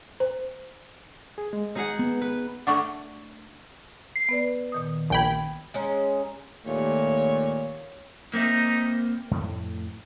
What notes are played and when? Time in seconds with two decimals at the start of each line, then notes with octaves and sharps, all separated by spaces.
0.20 C5
1.38 G#4
1.53 G#3
1.75 D#4 G#4 F#5
1.99 B3
2.22 B4
2.67 A3 D4 F#5 C#6
4.16 C7
4.29 B3 B4 D5
4.72 A#2 D#3 D#6
5.10 A#1 G5 G#5 B5 G#6
5.74 G#3 C#4 A#5
6.66 D#2 A#2 A3 C#5
8.34 A#3 C4 D#4 E5
9.31 F2 A2 A3